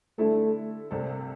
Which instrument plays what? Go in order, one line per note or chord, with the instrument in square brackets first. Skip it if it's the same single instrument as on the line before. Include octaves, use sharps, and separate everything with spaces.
[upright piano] D3 G3 E4 A4 [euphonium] A3
[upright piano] C2 C3 G3 C4 A4